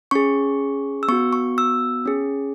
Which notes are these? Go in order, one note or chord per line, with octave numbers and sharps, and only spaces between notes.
C#4 G#4 C#6
E6
B3 F#4 C#6
C#6
E6
C#4 G#4